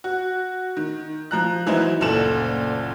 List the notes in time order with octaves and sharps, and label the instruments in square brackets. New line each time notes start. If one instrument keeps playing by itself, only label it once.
[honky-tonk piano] F#4
D#3
F3 A#5 F#6
E3 F#3 D#4 E4 C5
F#1 D2 A#2 A4 E7 F#7